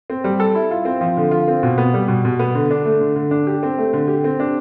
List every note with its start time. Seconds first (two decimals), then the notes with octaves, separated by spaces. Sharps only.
0.10 C4
0.24 G3
0.40 A4
0.55 E4
0.71 F4
0.85 C4
1.01 F3
1.17 D3
1.31 F4
1.48 C4
1.63 B2
1.78 B3
1.94 G3
2.08 B2
2.25 B2
2.39 B3
2.55 D3
2.71 D4
2.85 A3
3.01 D3
3.16 D3
3.31 D4
3.47 G4
3.63 C4
3.78 A3
3.93 D3
4.08 G4
4.24 C4
4.40 D4